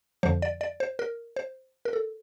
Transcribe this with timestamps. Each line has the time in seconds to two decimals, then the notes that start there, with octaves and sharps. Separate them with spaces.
0.23 F2 D3 F3 C5
0.42 D5
0.61 D5
0.80 C5
0.99 A#4
1.36 C5
1.85 A#4
1.93 A4